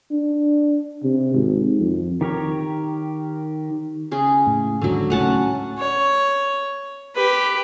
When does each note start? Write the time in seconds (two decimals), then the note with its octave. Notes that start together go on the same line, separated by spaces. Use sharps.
0.11 D4
1.03 C3
1.34 G#1
1.79 F2
2.21 D#3 G4 A#4 C#5
4.11 C#3 G#4
4.47 A2
4.82 G#1 D#2 G#2 D3 F#3
5.10 C#2 A2 A3 C#4 F#5 A5
5.78 C#5
7.15 G4 B4